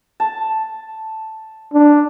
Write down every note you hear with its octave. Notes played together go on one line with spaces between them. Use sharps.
A5
D4